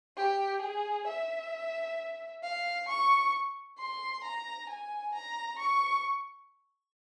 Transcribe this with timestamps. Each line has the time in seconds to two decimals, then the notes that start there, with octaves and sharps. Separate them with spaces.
0.17 G4
0.62 G#4
1.08 E5
2.43 F5
2.88 C#6
3.78 C6
4.24 A#5
4.69 G#5
5.14 A#5
5.59 C#6